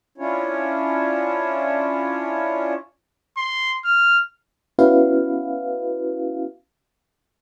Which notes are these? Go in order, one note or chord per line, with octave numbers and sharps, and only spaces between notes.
C#4 D4 E4 F4 C#5
C6
F6
B3 C#4 E4 F#4 B4 F5